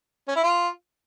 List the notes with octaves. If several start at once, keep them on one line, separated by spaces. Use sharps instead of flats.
C#4
E4
F4